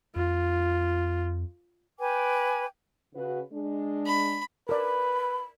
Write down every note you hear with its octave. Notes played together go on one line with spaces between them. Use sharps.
F2 F4
B4 G5 G#5 D6
C#3 F#4 B4
G#3 D4
B5
A#4 B4 D5 B5